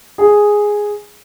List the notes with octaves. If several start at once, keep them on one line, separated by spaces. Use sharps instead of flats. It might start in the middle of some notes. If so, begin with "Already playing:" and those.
G#4